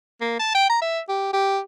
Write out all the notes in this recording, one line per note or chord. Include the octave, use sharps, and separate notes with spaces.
A#3
A5
G5
A#5
E5
G4
G4